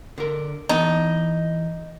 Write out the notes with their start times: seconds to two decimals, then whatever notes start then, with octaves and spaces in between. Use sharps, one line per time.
0.18 D3 A#4
0.69 E3 B3 D#4 A5